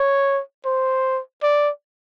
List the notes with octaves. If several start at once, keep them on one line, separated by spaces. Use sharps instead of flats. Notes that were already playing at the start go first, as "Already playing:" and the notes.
Already playing: C#5
C5
D5